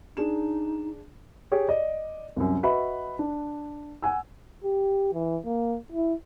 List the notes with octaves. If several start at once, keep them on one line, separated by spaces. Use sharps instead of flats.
D4 D#4 G#4 E7
G4 G#4 C#5
D5 D#5
C2 F#2
F#4 B4 D#5 E5 B5
D4
F#5 G#5 E6
G4
E3
A#3
E4